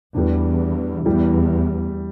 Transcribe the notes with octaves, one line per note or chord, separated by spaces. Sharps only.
E2 A2 G3 B3 D4
E2 A2 E3 G3